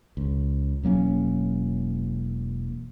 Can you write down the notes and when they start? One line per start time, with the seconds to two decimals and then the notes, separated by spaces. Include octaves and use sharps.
0.17 C#2
0.83 E1 F#3 A#3 C#4